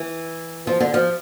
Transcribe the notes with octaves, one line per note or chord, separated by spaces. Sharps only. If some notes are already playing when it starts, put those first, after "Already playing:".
Already playing: E3
F3
D3
F3